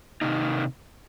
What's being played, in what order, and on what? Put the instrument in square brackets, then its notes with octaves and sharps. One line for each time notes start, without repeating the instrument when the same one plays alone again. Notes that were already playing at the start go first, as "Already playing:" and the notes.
[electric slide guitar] C3 D#3 A#3 D#4